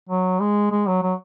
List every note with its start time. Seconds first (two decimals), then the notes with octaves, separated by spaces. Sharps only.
0.09 F#3
0.40 G#3
0.71 G#3
0.87 F#3
1.02 F#3